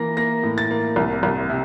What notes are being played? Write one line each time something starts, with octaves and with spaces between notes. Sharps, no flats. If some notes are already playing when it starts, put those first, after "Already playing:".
Already playing: E3 A#3 A#6
A#3 A#6
A2
A6
A#3
C2
C2
C3